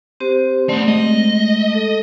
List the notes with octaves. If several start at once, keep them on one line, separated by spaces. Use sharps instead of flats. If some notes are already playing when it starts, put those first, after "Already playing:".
C4 G4 C5
A3 B3 C4 D5 C6
G#3 D#5
A4